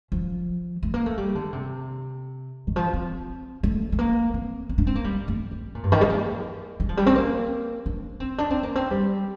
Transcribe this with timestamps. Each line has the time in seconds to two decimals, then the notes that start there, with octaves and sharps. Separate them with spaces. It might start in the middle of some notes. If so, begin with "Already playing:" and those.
0.12 F3
0.83 A3
0.94 A#3
1.06 A3
1.18 G3
1.35 D3
1.53 C3
2.67 D#3
2.76 F3
2.93 C4
3.63 A3
3.92 A3
3.99 A#3
4.34 C4
4.69 C4
4.78 D4
4.87 C4
4.95 A#3
5.04 G3
5.28 A3
5.51 C4
5.63 D3
5.75 A#2
5.83 G2
5.92 D#3
6.01 G3
6.06 C4
6.10 A#3
6.80 G3
6.89 F3
6.97 G3
7.06 C4
7.15 A#3
7.86 D4
8.20 C4
8.38 D4
8.50 C4
8.63 A#3
8.75 C4
8.91 G3